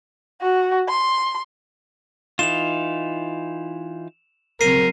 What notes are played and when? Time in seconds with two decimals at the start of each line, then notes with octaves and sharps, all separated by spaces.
0.42 F#4
0.89 C6
2.39 E3 D#4 F4 E7 F7
4.61 C#3 F#3 C4 A#4 C7 D#7